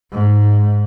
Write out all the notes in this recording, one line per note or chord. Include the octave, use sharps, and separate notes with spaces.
G#2